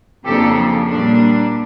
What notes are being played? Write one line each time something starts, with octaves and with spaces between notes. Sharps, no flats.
F2 C#3 F3 A#3 D4 G4 A4
A#2 G3 A#3 D4